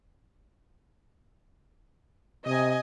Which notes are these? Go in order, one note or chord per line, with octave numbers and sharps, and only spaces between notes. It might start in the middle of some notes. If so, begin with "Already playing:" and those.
C3 D#5 G#5